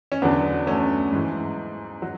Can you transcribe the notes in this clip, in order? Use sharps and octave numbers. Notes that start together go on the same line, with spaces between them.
C#4
E2 D3 F#3 B3 D4
A3 C#4
G#2 E3
F#3